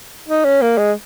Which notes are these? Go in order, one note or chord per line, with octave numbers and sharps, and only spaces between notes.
D#4
C#4
A#3
G#3